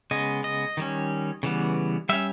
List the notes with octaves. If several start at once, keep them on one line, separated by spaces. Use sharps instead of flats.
C#3 G#3 B3 D#5
D#5
D#3 G3 C#4
C#3 E3 G3 B3
G3 C#4 E5